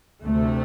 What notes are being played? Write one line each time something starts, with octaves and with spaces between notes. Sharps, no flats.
D2 C3 A3